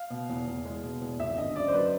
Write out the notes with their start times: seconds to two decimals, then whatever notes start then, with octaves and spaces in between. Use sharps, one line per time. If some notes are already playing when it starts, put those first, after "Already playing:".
Already playing: F5
0.10 B2
0.29 E2
0.47 E2
0.65 G#3
0.83 B2
1.01 E2
1.19 G#1 E5
1.38 D3 D#5
1.56 F#2 D5
1.68 C5
1.73 F#3 B4